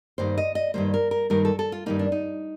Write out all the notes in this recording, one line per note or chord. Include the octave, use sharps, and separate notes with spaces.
G2 D#3 G3 A#3 C5
D#5
D#5
G2 D#3 G3 A#3 C5
A#4
A#4
G2 D#3 G3 A#3 A#4
A4
A4
F4
G2 D#3 G3 A#3 D#4
D4
D#4